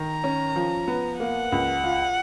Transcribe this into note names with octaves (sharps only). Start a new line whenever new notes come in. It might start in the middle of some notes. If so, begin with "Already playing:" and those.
Already playing: D#3 A#5
C#4
F3
B3
A#3 F#5
C#2
F4